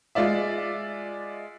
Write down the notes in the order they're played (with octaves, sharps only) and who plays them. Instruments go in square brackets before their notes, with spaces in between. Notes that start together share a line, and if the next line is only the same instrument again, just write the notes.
[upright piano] G#3 F4 D5 E5